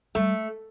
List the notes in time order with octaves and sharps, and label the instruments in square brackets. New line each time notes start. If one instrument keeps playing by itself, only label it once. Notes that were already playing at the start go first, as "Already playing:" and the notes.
[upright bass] G3 [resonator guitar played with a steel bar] A3